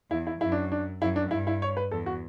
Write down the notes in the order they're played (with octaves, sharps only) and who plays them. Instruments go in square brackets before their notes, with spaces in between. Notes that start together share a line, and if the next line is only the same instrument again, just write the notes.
[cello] E2 [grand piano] E4
[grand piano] E4
[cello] F#2 [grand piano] E4
[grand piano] D4
D4
[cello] F#2 [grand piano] E4
[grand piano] D4
[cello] G2 [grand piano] E4
[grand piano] E4
C#5
B4
[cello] E2 [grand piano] A4
[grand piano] F#4